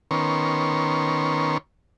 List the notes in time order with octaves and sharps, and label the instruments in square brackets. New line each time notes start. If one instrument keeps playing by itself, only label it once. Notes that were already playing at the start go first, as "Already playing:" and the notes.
[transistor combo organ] D#3 B3 C#4 A#4 C6 C#6